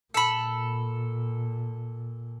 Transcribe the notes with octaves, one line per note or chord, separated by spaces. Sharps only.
A#2 A4 B5